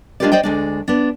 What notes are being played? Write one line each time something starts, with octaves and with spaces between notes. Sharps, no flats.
G#3 D4 F4 G4 A#4 D5
C5 D5 D#5 G5
D2 G#3 D4
B3 D4